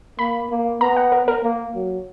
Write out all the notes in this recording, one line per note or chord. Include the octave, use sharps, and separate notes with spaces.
A#3 B5
A#3
B3 A#5
F#5
A#4
A#4
A#3
F#3